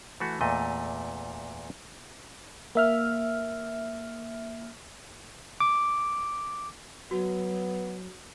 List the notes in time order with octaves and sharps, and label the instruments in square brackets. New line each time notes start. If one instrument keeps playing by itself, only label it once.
[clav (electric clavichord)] E3 A3 F#4
E2 A#2 A3 D#5
[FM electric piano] A#3 E5 F6
[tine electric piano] D6
[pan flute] F#3 [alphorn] B3 [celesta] F#4